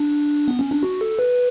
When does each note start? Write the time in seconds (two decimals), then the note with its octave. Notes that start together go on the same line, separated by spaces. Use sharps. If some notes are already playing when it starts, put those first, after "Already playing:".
Already playing: D4
0.48 B3
0.59 C#4
0.71 D4
0.83 F#4
1.01 A4
1.19 B4